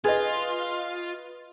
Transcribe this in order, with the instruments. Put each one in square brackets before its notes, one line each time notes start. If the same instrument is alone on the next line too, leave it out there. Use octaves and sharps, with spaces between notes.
[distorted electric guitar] F4 [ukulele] G#4 [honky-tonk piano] B4 D#5